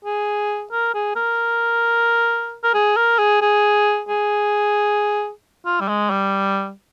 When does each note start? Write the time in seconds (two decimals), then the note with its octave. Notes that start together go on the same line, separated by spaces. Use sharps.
0.05 G#4
0.72 A#4
0.94 G#4
1.16 A#4
2.64 A#4
2.74 G#4
2.97 A#4
3.19 G#4
3.42 G#4
4.09 G#4
5.66 F4
5.80 G3
5.88 G#3
6.10 G3